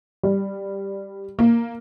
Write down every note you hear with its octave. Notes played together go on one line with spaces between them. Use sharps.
G3
A#3